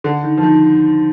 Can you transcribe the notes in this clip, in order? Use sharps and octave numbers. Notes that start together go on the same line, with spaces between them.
D3
D#3
F3
D#3